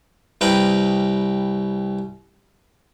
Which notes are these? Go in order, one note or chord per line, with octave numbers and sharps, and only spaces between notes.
C2 B4 G5 A#5